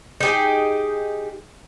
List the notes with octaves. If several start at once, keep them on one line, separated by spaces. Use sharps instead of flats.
D#4 G4 G#4